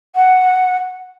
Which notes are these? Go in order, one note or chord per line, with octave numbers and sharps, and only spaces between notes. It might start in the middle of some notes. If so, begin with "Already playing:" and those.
F#5